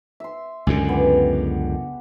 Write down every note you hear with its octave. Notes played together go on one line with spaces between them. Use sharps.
E5 C6
C#2 F#2 D3 G#4
B3 G4